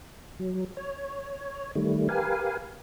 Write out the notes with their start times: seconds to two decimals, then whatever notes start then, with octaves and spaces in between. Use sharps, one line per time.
0.39 F#3
0.77 C#5
1.75 D#3 G3 A3
2.09 G4 A#4 B4 F5 G#5